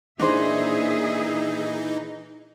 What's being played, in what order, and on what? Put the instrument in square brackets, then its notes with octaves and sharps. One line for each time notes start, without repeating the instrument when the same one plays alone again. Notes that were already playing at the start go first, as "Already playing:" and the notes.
[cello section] A#2 G#4 E5 [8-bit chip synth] E3 D#4 [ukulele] D4 C5